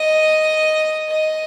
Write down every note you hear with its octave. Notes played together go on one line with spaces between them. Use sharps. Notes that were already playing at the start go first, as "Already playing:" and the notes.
Already playing: D#5
D#5